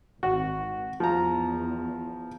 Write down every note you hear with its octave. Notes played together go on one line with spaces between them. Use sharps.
G#1 F#4
E2 F3 A#5